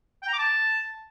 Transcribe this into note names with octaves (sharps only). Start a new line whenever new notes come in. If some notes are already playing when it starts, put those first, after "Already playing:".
G5
A#5
D6
A5